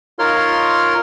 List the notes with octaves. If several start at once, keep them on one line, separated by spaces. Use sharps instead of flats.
D#4 F4 A#4 C#5 C6 F6